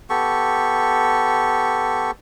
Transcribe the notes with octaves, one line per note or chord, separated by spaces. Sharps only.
B3 G4 A4 C#6